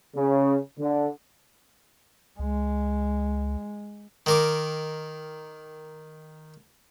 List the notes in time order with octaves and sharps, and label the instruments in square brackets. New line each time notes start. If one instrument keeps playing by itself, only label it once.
[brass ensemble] C#3
D3
[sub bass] C#2 [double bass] G#3
[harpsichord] D#3 A#4 D6